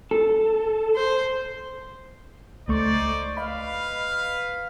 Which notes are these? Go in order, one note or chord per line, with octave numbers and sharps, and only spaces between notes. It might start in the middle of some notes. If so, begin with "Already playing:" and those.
A4
C5
C#2 A3 D#4 C5 D5 C#6
B4 D#5 F5 B5